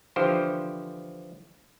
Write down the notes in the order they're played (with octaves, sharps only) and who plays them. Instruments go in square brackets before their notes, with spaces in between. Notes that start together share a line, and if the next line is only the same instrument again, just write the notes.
[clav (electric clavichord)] D3 E3 F3 G4 C5